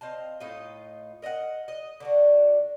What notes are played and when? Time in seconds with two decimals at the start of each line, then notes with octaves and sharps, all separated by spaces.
0.01 C4 D#5 F5 A5
0.40 A2 D#4 F4 D#5
1.22 A#4 D#5 E5 F#5
1.68 D#5
2.00 D3 D4 F#4